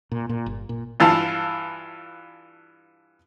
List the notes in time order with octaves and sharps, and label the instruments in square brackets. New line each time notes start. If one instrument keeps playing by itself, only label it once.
[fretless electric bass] A#2
A#2
G1
A#2
[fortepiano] G2 E3 F4 A5